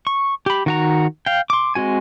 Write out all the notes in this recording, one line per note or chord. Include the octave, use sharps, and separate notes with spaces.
C#6
G4 B5
D#3 F#4 A#5
F5 G5
C6 D6
G#3 C4 F#4 G#5